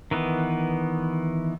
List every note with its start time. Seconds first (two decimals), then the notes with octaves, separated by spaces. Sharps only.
0.11 D#3 E3 B3